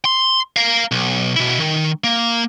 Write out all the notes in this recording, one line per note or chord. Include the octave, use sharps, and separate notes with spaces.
C6
A#4 F5
B1
B2 E4
D#3
A#3